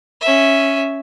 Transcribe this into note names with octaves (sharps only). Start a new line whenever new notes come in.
C#4 E5